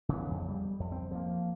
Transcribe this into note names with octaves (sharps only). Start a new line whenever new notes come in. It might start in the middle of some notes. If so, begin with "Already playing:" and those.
C#3 E3 B3
F2 C#3
G3
F2
C4
F3 A#3